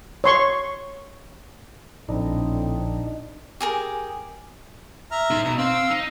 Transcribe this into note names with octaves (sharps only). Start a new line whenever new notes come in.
C#5 C6 C#6
A#1 A2 D3 C4 D4 D#4
G4 G#4 A#4
E5 A#5 F6
D#4 C6
B2 A#5
C4 F5 E6
D#4